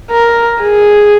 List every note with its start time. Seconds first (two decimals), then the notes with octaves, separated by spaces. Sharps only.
0.11 A#4
0.62 G#4